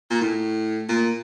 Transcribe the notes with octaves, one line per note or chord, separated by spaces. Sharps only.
A#2
A2
A#2